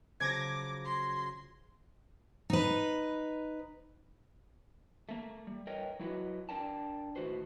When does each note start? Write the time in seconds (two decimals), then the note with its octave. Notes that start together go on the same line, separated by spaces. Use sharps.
0.20 C#3 F3 F#3 D6 G#6 A#6
0.85 C6
2.50 D#4 B4
5.09 A3 A#3
5.47 G3
5.67 A#4 B4 C#5 D#5 G5
6.00 F#3 E4 F#4 B4 D#5
6.49 D4 A#4 D5 G5 A5
7.16 A2 D#3 F#4 B4 C5